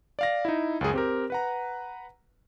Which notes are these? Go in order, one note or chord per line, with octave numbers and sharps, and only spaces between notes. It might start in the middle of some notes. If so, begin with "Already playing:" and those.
D5 F5 A#6
D#4 E4
C#2 F#2 G#4
C4 G4 A#4
B4 F#5 A#5